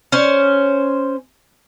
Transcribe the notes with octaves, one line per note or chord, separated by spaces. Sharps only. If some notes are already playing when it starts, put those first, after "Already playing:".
C#4 C5